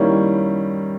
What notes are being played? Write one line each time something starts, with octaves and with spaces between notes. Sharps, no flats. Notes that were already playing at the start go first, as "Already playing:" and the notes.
Already playing: D#3 G3 A#3 C#4 E4